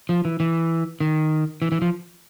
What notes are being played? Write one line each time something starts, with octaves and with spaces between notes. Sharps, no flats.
F3
E3
E3
D#3
E3
E3
F3